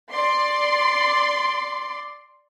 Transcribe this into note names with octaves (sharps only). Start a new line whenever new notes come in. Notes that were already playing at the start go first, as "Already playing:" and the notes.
D5 C6